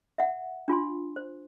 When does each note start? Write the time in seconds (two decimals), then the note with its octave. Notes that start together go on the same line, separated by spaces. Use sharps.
0.18 E5 F#5
0.68 D4 F4 G#5 C6
1.16 C5